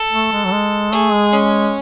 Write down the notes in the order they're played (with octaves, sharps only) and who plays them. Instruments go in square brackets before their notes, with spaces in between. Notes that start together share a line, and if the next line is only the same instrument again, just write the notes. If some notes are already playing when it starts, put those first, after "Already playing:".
Already playing: [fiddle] A4
[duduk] A3
G#3
F#3
G#3
[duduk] A3 [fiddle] G#4
[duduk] G#3
[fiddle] C#4